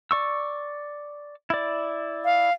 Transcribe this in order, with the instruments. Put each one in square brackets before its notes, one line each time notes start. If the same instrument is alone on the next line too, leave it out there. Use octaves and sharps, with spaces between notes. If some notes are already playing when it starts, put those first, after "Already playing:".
[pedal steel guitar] D5 C#6 E6
E4 D5
[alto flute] F5